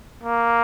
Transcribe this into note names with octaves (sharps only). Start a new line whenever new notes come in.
A#3